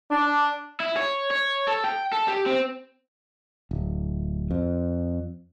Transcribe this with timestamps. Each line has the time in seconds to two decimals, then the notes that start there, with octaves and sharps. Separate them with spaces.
0.11 D4
0.80 E4
0.97 C#5
1.31 C#5
1.68 A4
1.84 G5
2.12 A4
2.28 G4
2.46 C4
3.71 D1
4.51 F2